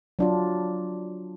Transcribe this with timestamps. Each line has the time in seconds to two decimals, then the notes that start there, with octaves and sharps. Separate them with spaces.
0.19 F#3 D4 F4